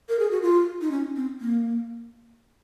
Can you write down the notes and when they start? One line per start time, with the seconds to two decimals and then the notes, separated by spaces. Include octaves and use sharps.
0.09 A#4
0.19 G#4
0.31 F#4
0.42 F4
0.81 D#4
0.91 C#4
1.16 C4
1.41 A#3